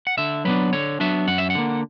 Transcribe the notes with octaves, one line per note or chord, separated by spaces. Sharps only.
F#5
D3 E5
F#3 B3 D4 B4
D3 C#5
F#3 B3 D4 E5
F#2 F#5
E5
F#5
D3 A#3